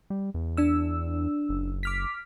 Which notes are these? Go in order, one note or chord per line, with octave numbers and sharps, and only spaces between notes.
G3
E2
D4 E6
F#1
D6 F6 B6